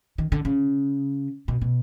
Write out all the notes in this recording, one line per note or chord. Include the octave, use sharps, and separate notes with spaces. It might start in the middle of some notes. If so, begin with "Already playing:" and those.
D#3
D3
C#3
B2
B2